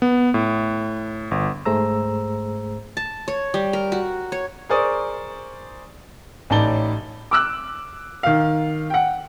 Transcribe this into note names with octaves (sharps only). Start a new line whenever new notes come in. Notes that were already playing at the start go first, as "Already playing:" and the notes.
B3
A2
G1
G#2 A3 G#4 C5 A#5 E6
A5
C#5
G3
A#4
F#4
C#5
G#4 A#4 C5 D5 C#6 D#6
A1 A2 D#4 D5 A5 G7
D6 E6 F#6
D#3 F5
F#5 G5